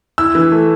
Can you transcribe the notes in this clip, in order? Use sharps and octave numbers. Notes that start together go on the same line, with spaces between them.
E4 E6
E3
A3